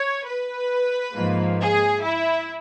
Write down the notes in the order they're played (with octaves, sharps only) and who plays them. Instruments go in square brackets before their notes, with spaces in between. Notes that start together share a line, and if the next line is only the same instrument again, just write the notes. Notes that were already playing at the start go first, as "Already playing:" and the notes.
Already playing: [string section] C#5
B4
G#2 F3 A#3
G#4
E4